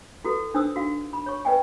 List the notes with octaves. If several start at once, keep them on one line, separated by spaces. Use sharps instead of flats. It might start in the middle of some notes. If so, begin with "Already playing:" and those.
E4 F#4 A4 B4
D4 D#4 C5 D#6 E6
F#4 F5
B5
C#5 C#6
B4 D5 D#5 G5 G#5